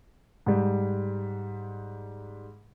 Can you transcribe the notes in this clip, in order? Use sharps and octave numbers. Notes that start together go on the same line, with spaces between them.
G#2 G3